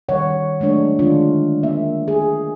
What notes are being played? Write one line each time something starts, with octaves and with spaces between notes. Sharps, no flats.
D#3 G3 C#5 F#5
F#3 G#3 A3 D4 C#5
D3 D#3 G#3 D4 F4
A#3 E5
G#4